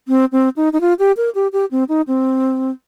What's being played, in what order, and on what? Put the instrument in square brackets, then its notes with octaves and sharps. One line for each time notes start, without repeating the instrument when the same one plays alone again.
[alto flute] C4
C4
D#4
D#4
F4
G4
A#4
G4
G4
C4
D#4
C4